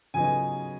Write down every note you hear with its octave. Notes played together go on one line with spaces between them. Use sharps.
C#3 F#3 B3 D#4 G#5
G#5